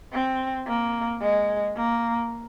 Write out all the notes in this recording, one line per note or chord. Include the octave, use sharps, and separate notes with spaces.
C4
A#3
G#3
A#3